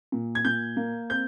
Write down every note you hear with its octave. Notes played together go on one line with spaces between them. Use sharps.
A#2
G#6
A#2 G6
A#3
C4 G6